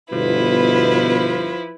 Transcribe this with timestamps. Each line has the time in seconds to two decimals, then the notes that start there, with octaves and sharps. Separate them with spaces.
0.12 G1 B2 F3 E4 B4